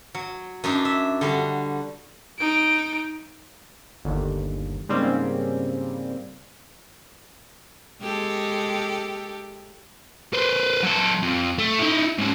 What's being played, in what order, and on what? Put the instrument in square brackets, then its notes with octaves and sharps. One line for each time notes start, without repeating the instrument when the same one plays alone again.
[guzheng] F#3
F#2 D4 D#4
E5
D3 G3 F#4
[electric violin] D#4 D7
[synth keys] G1 D#2
G#2 C#3 G3 A#3 C4 C#4
[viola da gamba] G#3 G4 A4
[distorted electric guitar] B4 C5
F#3 A4
F2
A3
D#4 E4
G#2 C#4